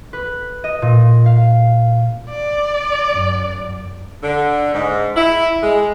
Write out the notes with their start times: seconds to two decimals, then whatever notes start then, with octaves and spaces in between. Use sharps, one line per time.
0.13 B4
0.64 D#5
0.82 A#2
1.26 F5
2.30 D5
3.11 F#2
4.22 D3
4.73 G#2
5.16 E4
5.62 G#3